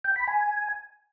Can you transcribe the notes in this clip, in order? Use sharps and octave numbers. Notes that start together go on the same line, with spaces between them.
G5
B5
G#5